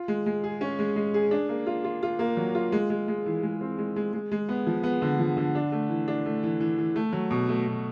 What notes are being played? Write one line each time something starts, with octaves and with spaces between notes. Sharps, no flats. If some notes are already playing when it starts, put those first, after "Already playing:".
Already playing: F4
G#3
G#3
G#4
C#4
G#3
G#3
G#4
D4
A#3
F4
F4
F4
A#3
F#3
F4
G#3
G#3
G#3
E3
G#3
C4
G#3
G#3
G#3
G#3
B3
F3
B3
D3
F3
D3
D4
A3
E3
D4
A3
E3
E3
E3
A3
F#3
B2
A3
B2